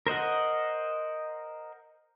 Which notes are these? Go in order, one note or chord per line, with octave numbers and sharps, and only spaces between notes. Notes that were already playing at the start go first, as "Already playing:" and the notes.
A#4 C5 D#5 F#5